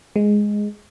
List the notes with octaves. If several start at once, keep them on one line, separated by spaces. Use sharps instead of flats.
G#3